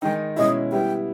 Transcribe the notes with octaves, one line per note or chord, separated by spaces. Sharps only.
D#3 G#3 D#4 G5
B2 G#3 C#4 E4 D#5
G3 B3 E4 G5